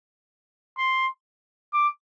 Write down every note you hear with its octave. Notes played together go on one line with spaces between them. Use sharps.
C6
D6